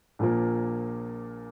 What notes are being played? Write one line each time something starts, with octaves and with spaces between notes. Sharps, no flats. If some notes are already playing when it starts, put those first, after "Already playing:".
A#1 A#2 F3 A#3